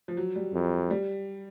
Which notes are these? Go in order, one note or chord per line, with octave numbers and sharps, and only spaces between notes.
F3
F#3
G3
F2
G3